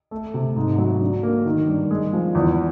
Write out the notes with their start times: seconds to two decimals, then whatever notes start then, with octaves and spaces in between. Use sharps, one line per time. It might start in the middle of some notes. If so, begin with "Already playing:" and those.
0.11 A3
0.34 C3
0.56 G#2
0.78 F#3
1.01 D3
1.23 A#3
1.45 D#3
1.68 G2
1.91 G#3
2.13 F3
2.35 E2